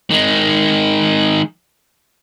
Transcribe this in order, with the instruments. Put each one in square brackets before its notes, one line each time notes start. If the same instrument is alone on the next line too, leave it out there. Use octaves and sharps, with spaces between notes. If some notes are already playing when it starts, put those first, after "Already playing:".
[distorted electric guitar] D#3 G#3